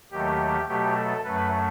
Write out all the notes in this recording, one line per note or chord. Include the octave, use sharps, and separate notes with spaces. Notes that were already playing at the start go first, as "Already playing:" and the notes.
D#2 D#3 F#3 A3 G4
B2 F#3 A3 G4
A4
F#2 F#3 A3 B4